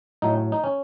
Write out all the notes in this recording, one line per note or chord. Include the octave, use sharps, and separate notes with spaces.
A2 F#3 A3 D#4
D#4
C#4